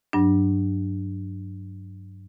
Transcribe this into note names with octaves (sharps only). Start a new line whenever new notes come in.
G2 F#3 D4